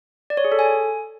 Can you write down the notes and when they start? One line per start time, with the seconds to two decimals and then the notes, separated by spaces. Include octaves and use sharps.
0.30 D5
0.37 C#5
0.45 G#4
0.52 A4
0.59 G#5